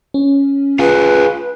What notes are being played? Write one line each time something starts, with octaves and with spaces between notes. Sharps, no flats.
C#4
F4 G#4 B4